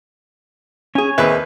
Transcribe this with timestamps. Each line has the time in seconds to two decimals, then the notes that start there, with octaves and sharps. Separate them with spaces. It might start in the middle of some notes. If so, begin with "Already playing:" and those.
0.95 C#4 G#4 C#5 G#5
1.18 D#2 C4 G#4 B4 E5